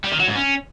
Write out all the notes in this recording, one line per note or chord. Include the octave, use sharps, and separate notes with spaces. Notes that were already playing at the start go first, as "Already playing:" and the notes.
G3
D#3
F#3
G#2
C#4